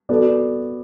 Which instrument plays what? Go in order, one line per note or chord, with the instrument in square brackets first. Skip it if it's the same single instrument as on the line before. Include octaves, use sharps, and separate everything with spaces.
[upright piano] B3 F#4 A4 D5